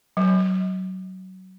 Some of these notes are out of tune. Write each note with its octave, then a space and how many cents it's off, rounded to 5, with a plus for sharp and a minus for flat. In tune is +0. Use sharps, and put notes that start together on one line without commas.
F#3 +20